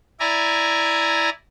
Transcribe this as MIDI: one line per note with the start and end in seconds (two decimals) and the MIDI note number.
0.20 1.30 64
0.20 1.30 74
0.20 1.30 80
0.20 1.30 82